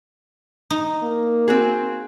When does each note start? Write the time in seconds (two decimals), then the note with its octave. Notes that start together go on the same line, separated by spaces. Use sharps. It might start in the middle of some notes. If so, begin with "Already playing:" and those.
0.70 D#4
1.03 A#3
1.48 C4 F#4 G#4